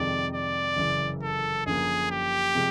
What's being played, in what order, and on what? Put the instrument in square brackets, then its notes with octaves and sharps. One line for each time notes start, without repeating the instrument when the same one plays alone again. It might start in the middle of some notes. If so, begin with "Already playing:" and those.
Already playing: [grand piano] F2 C3 D#3 G#3 [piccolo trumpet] D5
[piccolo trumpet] D5
[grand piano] F#1 F#2 C#3 E3
[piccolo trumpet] A4
[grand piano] F#2 D3 F3 A#3 [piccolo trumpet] G#4
[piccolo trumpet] G4
[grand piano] C3 F3 G#3